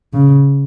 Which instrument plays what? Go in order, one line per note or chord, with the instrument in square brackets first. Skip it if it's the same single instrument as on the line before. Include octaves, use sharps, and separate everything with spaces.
[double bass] C#3